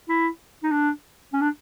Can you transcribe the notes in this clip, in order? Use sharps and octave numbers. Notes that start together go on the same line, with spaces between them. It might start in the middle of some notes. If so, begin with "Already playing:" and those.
E4
D#4
D4
C#4
D4